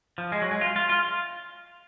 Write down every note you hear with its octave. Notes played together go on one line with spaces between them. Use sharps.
F3
G#3
F#3
G#3
F4
F4
F4